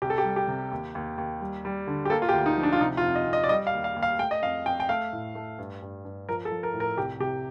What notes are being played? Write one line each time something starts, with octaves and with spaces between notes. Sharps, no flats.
C2 G4
A4
G4
G3
G4
C3
D#2
D#2
D#2
G3
G3
D3
G4
A#3 A4
F4
G4
D2
D#4
F3
D4
F4
C3 D#4
F4
F2
D#5
F2
D#5
D5
G3 D#5
F5
D#2
F5
D#2
F5
A3 G5
D#5
F2 F5
F2 G5
G5
A3 F5
A2
A3
G2
G2
G2
F3 A#4
A4
F3
A#4
A2
A#4
C2 G4
C3 G4